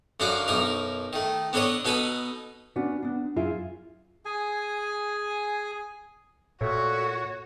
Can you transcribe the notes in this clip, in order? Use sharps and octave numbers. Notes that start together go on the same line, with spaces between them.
F#2 D3 D#4 F#4 F5 D6
B1 F#2 D#4 A#4
D#3 A3
B3 D4 A4 C#5 D#5
B2 B3 D#4 A4 B4 G#5
B3 C#4 D4 F#4 B4
B3 D4
F#2 E4 F4 G#4 E5
G#4 G#5
A#2 A3 F#4 C#5